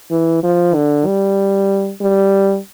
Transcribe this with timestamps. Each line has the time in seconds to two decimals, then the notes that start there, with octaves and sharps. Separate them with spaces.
0.11 E3
0.43 F3
0.75 D3
1.06 G3
2.01 G3